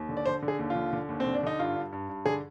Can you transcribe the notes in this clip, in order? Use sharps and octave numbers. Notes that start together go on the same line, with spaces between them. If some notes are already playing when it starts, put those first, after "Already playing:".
Already playing: D#2
D3
D5
D3 C5
D3
G#4
D#2
F4
D3
D3
D#2
C4
D3
D4
D3 D#4
G2 F4
G2
G2
G2
D3 G#4